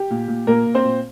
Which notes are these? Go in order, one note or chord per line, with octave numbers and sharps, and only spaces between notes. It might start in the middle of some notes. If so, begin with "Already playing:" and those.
Already playing: G4
A#2
A#2
A#2 A#3 A#4
A#2
C4 C5
A#2